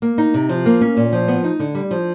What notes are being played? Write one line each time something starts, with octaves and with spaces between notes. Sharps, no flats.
A#3
D#4
C3
F3
A#3
C#4
A#2
F3
B3
D#4
D3
G3
F3